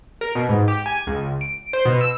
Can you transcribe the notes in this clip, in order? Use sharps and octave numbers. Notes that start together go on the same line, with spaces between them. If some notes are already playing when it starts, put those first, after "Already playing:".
A#4
B2
G#2
G4
G#5
C#2
D7
C5
B2
E6